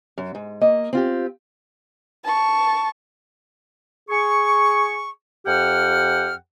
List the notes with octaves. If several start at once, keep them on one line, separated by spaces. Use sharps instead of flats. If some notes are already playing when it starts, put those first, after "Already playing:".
F#2
G#2
A#3 D#5
C4 F4 G4
A5 C#6
G#4 C#6
F2 G4 F#5 G5 F6